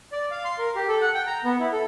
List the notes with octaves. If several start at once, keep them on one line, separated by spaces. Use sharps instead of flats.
D5
F5
C6
A#4
G4
A4
F#5
G5
A#5
B3
E4
A4